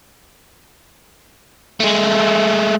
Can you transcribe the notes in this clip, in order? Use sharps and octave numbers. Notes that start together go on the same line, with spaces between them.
G#3 A3